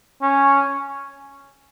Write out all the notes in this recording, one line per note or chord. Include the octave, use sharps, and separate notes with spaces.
C#4